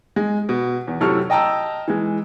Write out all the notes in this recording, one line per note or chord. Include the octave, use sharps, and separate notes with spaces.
G#3
B2
E2
F#2 A2 C3 A4 C#6 F6
D#5 G5 A5 A#5 E6
E3 G#3